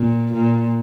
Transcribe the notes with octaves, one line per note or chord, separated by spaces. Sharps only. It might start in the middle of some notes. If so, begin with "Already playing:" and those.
Already playing: A#2
A#2